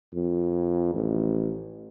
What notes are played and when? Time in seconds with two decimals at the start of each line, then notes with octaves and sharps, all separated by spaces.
0.14 F2
0.94 A1